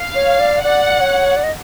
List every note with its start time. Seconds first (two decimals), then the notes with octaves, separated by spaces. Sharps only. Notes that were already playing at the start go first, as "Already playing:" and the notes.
Already playing: F5
0.15 C#5
0.40 D5
0.63 D5 F#5
1.00 C#5
1.36 D5
1.43 D#5